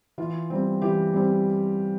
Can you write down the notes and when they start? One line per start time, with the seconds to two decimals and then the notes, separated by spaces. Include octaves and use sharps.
0.18 E3 F4
0.50 G3 C4
0.82 E3 G4
1.13 G3 C4